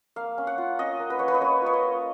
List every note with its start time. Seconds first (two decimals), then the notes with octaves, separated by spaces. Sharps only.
0.16 A#3 F5
0.38 C#4
0.47 F#5
0.58 F4
0.79 C#4 D#5
1.00 A#3
1.10 B4
1.19 A#3 C#5
1.28 B4
1.34 D#5
1.41 C#4 C#5
1.62 F4 C#5
1.73 D#5
1.83 A#3